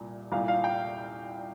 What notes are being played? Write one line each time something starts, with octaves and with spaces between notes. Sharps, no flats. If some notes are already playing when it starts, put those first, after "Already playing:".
Already playing: C2 A#2
C2 A#2 F5
F5
G5